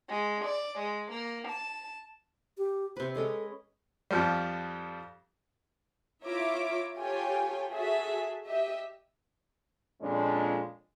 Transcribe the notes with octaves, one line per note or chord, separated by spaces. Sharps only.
G#3
D5
G#3
A#3
A5
G4
C3 B4 C5
G#3 C#4 A4 D#5
F2 F3 G3
E4 F4 C#5 E5 A#5 D6
F4 G4 A4 C#5 G5 G#5
F#4 G#4 A4 E5
G4 D#5 E5
F2 A#2 G#3 C#4 D4